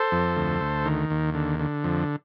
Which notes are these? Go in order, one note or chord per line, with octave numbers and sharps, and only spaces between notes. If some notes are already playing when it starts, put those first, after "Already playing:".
Already playing: A4 C5
F2
D2
D2
D#3
D#2
D3
D3
F2